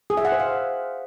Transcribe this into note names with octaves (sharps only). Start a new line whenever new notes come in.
G#4
E5
F#5
C5
F5